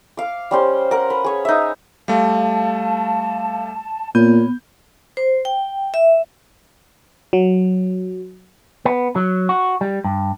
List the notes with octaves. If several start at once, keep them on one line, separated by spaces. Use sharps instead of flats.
F5 D6
G3 C#4 C5
A#4 F#5
B4
G#4 C#5
D#4 E5
G3 A3 F5 A5
A#2 B3 C#5 G6
C5
G5
E5
F#3
B3
F#3
F#4
G3
G2